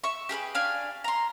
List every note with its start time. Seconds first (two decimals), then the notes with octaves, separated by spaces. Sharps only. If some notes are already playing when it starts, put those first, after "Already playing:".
0.04 E5 C#6
0.29 G4 G#4 A#4 B4
0.55 D4 F5 G#5
1.04 A#5 C6